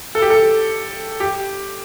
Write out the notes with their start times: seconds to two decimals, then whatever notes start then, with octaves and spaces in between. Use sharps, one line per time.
0.15 A4
0.22 G4
0.30 A4
1.20 G4